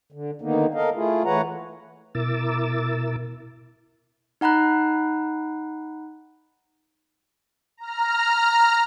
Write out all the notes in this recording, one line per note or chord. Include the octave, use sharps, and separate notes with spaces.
D3
D3 D#3 A#3 B3 D#4
A4 A#4 D#5 F5
A3 E4 F4 G#4
E3 A3 B4 C#5 F#5 A#5
B2 E4 A#4 D6 E6 A6
D#4 F#5 A#5 B5 F#6
A#5 F6